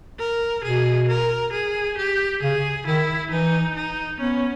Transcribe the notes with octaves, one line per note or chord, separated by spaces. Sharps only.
A#4
B2 G#4
A#4
G#4
G4
C#3 G#4
D#3 E4
E3 D#4
D#4
B3 C#4